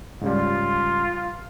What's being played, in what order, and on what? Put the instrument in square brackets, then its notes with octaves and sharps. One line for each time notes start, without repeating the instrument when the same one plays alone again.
[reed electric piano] G#2 C#3 G3 [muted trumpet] F4